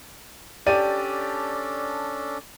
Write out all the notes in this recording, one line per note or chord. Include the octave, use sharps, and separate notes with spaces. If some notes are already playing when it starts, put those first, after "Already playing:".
C#4 D4 G4 A4 D5 D#7